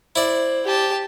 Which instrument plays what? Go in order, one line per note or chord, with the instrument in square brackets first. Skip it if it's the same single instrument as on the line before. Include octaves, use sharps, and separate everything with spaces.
[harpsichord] E4 D5 [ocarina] C5
[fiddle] G4 A5